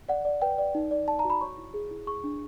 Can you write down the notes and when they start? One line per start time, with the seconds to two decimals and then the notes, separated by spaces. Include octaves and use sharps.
0.09 D5 F#5
0.25 D5
0.42 B4 G5
0.58 D5
0.75 D#4
0.91 D5
1.08 D5 A5
1.19 A#5
1.24 F#4
1.30 B5
1.41 C#5 C#6
1.58 E4
1.74 G#4
1.91 E4
2.07 G#4 C#6
2.24 D4